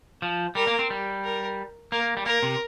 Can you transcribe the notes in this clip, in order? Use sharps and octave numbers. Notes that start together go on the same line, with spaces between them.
F3
G3 A#4
A#3
C4
G3
A#4
A#3 A#4
G3
A#3 A#4
C3